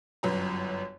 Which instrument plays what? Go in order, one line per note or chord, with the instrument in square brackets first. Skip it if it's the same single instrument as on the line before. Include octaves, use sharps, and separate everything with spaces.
[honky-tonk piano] G1 F#2 B4 A#5